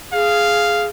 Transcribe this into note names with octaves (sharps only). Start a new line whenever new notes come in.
G#4 F5